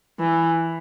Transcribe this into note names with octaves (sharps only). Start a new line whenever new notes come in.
E3